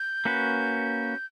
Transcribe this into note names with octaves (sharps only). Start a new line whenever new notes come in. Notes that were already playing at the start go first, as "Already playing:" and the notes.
Already playing: G6
A#3 C#4 F#4 B4